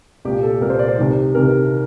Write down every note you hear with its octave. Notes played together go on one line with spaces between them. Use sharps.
C2 A#2 G4
A4
C2 A#2 A#4
C5
D5
C5
C2 C3 D#3
C2 C3 D#3 A#4